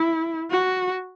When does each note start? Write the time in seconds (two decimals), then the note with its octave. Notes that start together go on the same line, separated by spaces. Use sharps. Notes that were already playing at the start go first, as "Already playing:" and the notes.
Already playing: E4
0.51 F#4